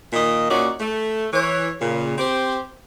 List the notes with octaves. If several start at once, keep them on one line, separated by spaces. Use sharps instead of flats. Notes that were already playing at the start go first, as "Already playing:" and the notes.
A#2 D#3 A#3 D#5
A#2 C#4 D#4 F#4 D5
A3
E3 C#5
A#2 C#3
C4 G4 C5